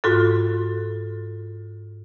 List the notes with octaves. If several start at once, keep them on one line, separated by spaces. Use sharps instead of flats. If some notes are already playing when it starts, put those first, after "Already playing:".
G#2 F4 F#4 A4